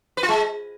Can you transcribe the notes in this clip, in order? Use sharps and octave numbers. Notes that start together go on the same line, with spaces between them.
B4
F4
G#3